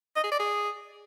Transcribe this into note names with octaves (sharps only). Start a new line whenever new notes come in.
D#5
G#4
D5
G#4